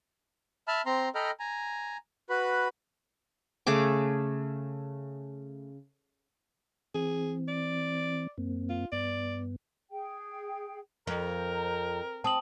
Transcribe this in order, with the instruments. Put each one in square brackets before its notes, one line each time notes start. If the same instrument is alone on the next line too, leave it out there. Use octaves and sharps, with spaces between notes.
[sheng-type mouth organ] E5 A5 B5 F6
C4 A#5 C6
A4 D#5 G5 A#5 B5 F6
G#5 A#5
F#4 B4 B5
[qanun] C#3 A3 G#4 D6
[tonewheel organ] E3 C4 [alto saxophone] G#4
[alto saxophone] D5
[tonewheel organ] F#2 A#3 C4
[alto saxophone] F4
[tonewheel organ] G2 B3 [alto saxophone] D5
[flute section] G#4 G5
[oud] F2 [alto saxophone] A#4 [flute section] C5 A#5
[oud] C4 [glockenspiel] A5 D#6 F#7